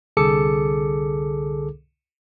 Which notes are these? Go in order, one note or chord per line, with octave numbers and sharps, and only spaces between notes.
C2 D3 G#4 A4 D6 C#7